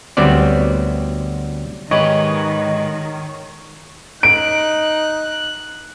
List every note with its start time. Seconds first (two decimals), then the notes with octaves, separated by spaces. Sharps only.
0.17 D2 F#3 G3 B3 C4 D5
1.91 G#2 D#3 G4 B4 C#5 D#5
4.23 D#4 F#6 D7